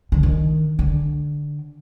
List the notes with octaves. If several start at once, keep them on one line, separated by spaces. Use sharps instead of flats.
D3
D#3
D3